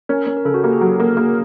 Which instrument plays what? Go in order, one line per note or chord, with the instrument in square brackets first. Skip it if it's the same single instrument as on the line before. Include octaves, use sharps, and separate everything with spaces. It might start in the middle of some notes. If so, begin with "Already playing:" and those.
[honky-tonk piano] C#4 [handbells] A#4
[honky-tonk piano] C#4 [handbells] A#4
[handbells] A#4
[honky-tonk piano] C#3 [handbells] A4
[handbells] F#4
[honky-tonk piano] A#3 [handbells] G4
[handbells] G#4
[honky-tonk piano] F#3 [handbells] A4
[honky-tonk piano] A#3 [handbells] A#4
[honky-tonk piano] A#3 [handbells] G#4